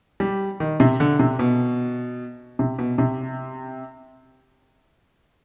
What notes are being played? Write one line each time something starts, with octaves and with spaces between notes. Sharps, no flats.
G3
D#3
C3
D3
C3
B2
C3
B2
C3